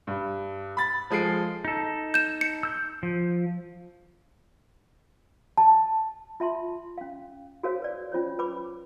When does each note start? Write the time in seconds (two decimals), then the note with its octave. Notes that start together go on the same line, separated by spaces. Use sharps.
0.07 G2
0.77 B5 A6
1.10 F3 G#3 A4 C7 D7
1.65 D#4 A4
2.14 G6 E7
2.41 C#7
2.63 E6 G6
3.03 F3
5.57 A5
6.40 F4 E5 A5 C6
6.98 C#4 F5
7.63 F#4 G#4 A#4 C5 C#5 F5
7.82 B4 D5
8.12 C#4 F4 C5 C#5
8.39 B4 B5 D6